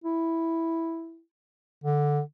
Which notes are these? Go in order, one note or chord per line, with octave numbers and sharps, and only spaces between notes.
E4
D3